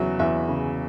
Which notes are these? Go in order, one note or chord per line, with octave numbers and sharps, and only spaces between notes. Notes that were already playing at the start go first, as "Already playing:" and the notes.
Already playing: E2 C#3 F#3 F#4 E5
E2 E5
C#3